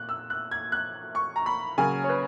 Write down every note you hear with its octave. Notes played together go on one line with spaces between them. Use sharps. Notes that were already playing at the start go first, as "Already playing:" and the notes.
Already playing: A#2 F#6
E6
F#6
G#6
F#6
C#6
A#5
B5
C#3 F#3 A#3 G#5
C#5
B4